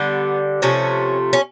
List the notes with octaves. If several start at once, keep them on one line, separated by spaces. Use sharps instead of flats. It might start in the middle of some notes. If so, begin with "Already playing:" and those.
Already playing: D3 G3 B3
C3 F3 A3 C#4
C#4